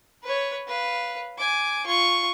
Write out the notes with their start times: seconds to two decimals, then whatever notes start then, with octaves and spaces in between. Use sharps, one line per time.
0.24 B4 C#5
0.67 B4 F5
1.38 G#5 D6
1.86 F4 C#6